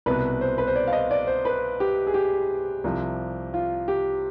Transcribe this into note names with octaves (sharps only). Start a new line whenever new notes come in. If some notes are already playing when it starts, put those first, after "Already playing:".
C2 B2 B4
C5
B4
C5
D5
F5
D#5
D5
C5
B4
G4
G#4
G4
C2 C3 F3
F4
G4